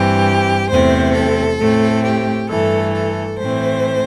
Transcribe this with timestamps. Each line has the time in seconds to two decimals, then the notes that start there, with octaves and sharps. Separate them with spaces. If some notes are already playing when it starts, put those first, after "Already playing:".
Already playing: G2 E3 C4 G4
0.69 E2 C3 A3 C4 C5
1.14 A4
1.59 A2 A3 C4
2.04 G4
2.49 G2 E3 A3 A4
2.94 A4
3.39 A2 E3 A3 C4 C5